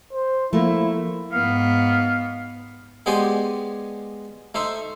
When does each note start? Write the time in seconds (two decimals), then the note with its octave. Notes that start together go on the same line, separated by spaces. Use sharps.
0.13 C5
0.53 F3 A3 A#3 E4
1.33 G#2 B3 F5
3.06 G#3 B3 G4 C5 D5 G#5
4.55 A3 D#4 C5 E5